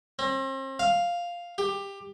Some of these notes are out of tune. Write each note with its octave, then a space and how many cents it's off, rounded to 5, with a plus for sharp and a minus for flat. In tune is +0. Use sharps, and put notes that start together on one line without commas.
C4 +40
F5 +0
G4 +15